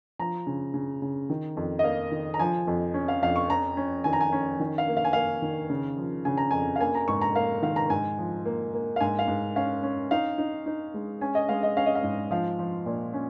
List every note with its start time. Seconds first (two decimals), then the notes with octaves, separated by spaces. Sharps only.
0.19 F3 A#5
0.47 C#3
0.74 C#3
1.02 C#3
1.30 D#3
1.57 F2
1.79 D#5
1.84 A#3 F5
2.11 D#3
2.34 A#5
2.39 F3 G#5
2.67 F2
2.94 C#4
3.08 F5
3.22 F2 F5
3.36 C#6
3.50 C#4 A#5
3.77 C#4
4.04 D#3 G#5
4.13 A#5
4.21 G#5
4.32 C#4
4.60 D#3
4.78 F5
4.88 A#3
4.97 F5
5.05 G#5
5.13 A#3 F5
5.42 D#3
5.70 C#3
5.97 F3
6.25 C#3 G#5
6.38 A#5
6.51 F2 G#5
6.76 F5
6.80 A#3 G#5
6.95 A#5
7.08 G#2 C#6
7.22 A#5
7.35 A#3 F5
7.62 D#3 F5
7.76 A#5
7.90 G#2 G#5
8.19 F3
8.45 A#3
8.73 A#3
8.96 F5
9.00 G#2 G#5
9.19 F5
9.28 G#2
9.56 C#4 F5
9.83 C#4
10.11 D#4 F5
10.38 D#4
10.66 D#4
10.94 G#3
11.21 C#4 G#5
11.35 D#5
11.49 G#3 F5
11.63 D#5
11.76 C#4 F5
11.86 D#5
11.95 F5
12.03 G#2
12.31 F3 F5
12.59 F3
12.86 A#2
13.14 C#4